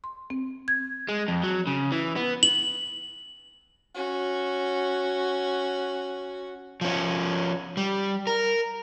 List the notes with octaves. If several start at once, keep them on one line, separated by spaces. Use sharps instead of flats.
C6
C4
G#6
G#3
F2
F#3
C#3
E3
B3
F#7
C#4 F#4
F3 C#4
G3
A#4